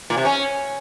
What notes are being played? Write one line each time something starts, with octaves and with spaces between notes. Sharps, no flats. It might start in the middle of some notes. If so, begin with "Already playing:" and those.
A#2
C3
C#4